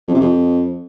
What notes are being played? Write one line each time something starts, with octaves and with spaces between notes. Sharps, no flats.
F2
C3
F2